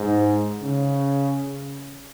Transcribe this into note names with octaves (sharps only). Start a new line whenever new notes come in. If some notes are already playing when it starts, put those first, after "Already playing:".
Already playing: G#2
C#3